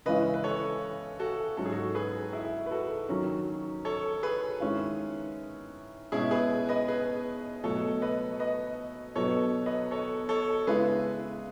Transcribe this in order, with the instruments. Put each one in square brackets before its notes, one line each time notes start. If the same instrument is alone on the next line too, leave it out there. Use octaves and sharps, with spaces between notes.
[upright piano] C#3 E3 G#3 C#4 E4 [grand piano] B4 D#5
[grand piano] B4
A4 C#5
F#4 A4
[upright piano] G#2 F#3 C#4 [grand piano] A4
[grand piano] G#4
F#4 A4
G#4 B4
E4 G#4
B4
F#4 A4
[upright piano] D#3 F#3 C#4
[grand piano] A4 C#5
G#4 B4
[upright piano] D#3 G#3 C#4 E4
[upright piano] B2 G#3 C#4 [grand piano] E4 G#4
[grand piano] G#4 B4
B4 D#5
G#4 B4
[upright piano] B2 F#3 A3 [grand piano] A4 C#5
[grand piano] B4 D#5
B4 D#5
[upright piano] B2 F#3 B3 [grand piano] A4 C#5
[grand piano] B4 D#5
A4 C#5
A4 C#5
[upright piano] C#3 G#3 B3 E4 [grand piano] G#4 B4